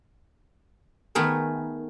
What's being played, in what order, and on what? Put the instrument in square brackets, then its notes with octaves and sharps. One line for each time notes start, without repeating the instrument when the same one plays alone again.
[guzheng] D#3 A3 B3 G#4 A#4